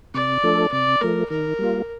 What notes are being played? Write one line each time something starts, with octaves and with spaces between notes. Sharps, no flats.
C3 D5
F3 A3 D4 A4
C3 D5
F3 A3 A#4
D#3 A#4
G3 A#3 F4